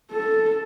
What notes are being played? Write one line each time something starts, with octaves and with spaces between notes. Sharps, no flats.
A4